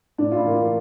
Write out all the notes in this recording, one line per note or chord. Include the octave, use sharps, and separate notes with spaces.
A2 D4
F4
E4
E3 A#3
F4